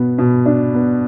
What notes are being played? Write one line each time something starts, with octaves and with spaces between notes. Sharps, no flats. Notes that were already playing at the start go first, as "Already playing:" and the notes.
Already playing: B2 B3
B2
D4
B3